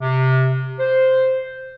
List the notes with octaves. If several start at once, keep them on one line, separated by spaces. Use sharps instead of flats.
C3
C5